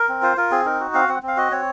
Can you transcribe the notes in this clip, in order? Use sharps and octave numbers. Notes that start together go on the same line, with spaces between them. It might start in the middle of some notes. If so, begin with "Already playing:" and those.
Already playing: A#4
C4
F4 C5
F4 A#4
C4 G#4
D#4 A#4
F#4
C4 F5
C4 F#5
C4
F5
F#4 D#5
C4 C#5